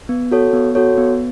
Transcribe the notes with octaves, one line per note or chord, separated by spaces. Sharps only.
B3
F#4 A4 C#5
B3
F#4 A4 C#5
B3